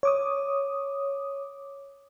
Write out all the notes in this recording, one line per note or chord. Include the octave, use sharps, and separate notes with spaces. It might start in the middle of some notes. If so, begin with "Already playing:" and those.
C#5 D6 D#6